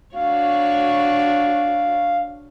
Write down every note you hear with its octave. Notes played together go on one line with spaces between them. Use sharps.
D4 F#4 C#5 F5